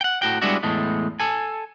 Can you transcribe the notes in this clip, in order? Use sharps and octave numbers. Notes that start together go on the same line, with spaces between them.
F#5 G5
A2 F#4 G5
G3 G#3 B3 D4 E4 F#4
E2 A2 G#3 A3
A4 G#5